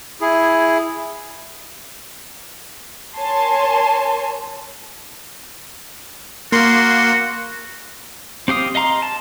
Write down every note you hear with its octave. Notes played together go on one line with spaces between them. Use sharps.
E4 G#4
A#4 C#5 G#5 A5 C6
A#3 F#4 C6
C4 G4 F5 D#6
D#5 F5 A#5 C6
A5